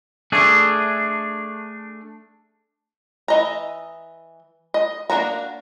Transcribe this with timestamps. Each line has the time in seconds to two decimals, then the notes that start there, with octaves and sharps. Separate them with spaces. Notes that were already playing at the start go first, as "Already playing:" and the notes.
0.32 A3 D4 G#4
3.28 E3 D#5 A#5
4.74 D#5
5.10 A#3 D4 F#4 A#5